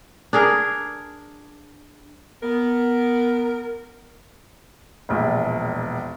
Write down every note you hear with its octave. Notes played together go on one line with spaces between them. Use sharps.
D4 G#4 A#4
B3 A#4
E1 A#1